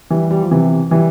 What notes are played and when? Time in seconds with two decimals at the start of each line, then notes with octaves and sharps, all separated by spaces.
0.10 E3 G3
0.31 G3
0.41 F3
0.51 C3 E3
0.91 E3 G3